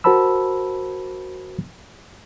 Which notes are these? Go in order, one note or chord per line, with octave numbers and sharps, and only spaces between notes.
F#4 A#4 C5 A5 B5 E6